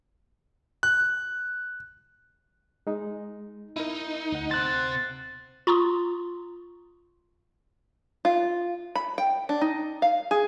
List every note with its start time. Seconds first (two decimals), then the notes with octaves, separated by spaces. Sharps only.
0.83 F#6
2.87 G#3 D#4
3.76 D#4 E4 A#4
4.32 D2 F#5
4.51 C3 C5 F#6 A6
5.67 F4 A#5 C6 C#6 D#6
8.25 F4
8.95 B5
9.18 G5
9.49 D4
9.61 D#4
10.02 F5
10.31 G#4